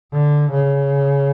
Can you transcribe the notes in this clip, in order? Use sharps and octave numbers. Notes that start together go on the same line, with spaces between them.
D3
C#3